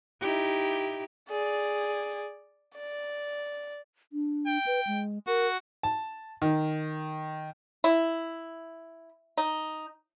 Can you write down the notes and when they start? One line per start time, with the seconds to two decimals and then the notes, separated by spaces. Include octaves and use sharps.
0.21 D#4 E4 G4
1.30 G#4 D5
2.76 D5
4.13 D4
4.46 G5
4.66 B4
4.87 G#3
5.27 F#4 A#4
5.83 A5
6.42 D#3
7.84 E4
9.37 D#4